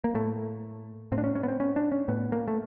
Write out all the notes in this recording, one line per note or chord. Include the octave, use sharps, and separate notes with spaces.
A#3
A2 A3
A2 C4
D4
C#4
C#4
B3
C4
C#4
D4
C#4
A2 B3
A#3
A3